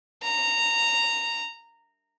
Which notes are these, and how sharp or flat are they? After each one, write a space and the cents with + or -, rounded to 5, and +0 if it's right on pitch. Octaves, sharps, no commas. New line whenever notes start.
A#5 -15